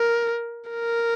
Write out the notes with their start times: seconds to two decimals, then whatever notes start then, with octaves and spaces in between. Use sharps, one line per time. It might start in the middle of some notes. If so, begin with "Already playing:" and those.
Already playing: A#4
0.70 A#4